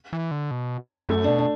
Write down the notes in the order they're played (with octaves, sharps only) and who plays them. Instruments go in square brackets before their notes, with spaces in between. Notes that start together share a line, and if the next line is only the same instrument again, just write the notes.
[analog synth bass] E3
D3
B2
[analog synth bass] F#2 [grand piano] A3
[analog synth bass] B2 [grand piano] D4
[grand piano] D4